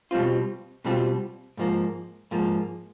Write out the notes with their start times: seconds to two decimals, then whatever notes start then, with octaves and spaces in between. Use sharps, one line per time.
0.11 B2 G3 C4 F4
0.85 B2 G3 C4 F4
1.57 G#2 F3 A#3
2.31 G#2 F3 A#3